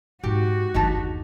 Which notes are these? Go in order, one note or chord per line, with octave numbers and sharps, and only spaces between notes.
G#2 F#4 G4
G1 D#2 G#3 D#4 G4 A5